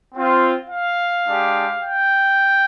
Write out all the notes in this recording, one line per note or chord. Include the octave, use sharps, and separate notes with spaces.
C4 F4
F5
G#3 D4 G4
G5